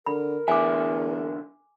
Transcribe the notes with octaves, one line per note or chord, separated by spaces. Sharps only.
D3 A#4 B5
B1 E2 D3 E5 G#5 D6